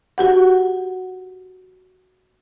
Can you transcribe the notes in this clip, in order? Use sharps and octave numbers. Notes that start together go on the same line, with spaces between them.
F#4 G4 F#5